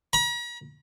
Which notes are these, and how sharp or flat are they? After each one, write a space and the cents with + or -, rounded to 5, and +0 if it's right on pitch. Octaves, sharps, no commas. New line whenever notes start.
A#5 +45